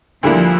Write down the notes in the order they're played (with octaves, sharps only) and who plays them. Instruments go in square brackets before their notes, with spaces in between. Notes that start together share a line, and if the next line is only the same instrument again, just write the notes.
[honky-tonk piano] D2 D3 G3 A#3 E4 [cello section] F3